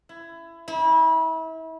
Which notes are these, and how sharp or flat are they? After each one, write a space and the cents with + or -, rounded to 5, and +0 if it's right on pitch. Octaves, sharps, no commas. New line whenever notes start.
E4 +20
E4 -35